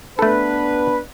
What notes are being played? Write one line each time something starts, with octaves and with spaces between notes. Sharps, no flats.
A3 B3 D4 A4 B4